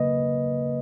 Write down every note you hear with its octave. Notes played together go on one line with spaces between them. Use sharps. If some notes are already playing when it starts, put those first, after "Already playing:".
Already playing: C#3 F#3 A#3 B4 D#5